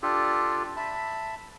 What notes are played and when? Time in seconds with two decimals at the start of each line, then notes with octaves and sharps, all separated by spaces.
0.03 D4 F4 G4 A4
0.77 E5 A5 B5